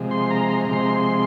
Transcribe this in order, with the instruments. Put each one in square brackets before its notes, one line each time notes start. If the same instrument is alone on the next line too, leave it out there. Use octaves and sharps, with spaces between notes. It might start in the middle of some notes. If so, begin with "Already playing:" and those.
Already playing: [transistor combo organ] C3 F3 G#3
C6
A#5
C6
A#5
C3 F3 G#3 C6